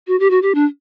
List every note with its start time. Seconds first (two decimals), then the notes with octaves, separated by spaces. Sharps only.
0.07 F#4
0.20 G4
0.31 F#4
0.42 G4
0.55 D4